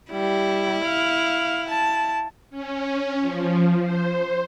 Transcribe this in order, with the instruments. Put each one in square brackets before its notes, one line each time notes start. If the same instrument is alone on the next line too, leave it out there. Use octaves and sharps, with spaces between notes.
[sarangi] G3 [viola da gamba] E4
[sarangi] F5
A5
[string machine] C#4
F3
C5